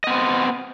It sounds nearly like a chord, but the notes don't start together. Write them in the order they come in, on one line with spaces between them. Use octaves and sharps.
D#5 B3 C4